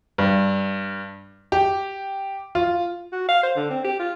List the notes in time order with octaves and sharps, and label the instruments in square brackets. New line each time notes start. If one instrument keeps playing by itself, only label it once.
[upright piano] G2
G4
F4
[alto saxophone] F#4
F5
C5
D3
C4
G4
F4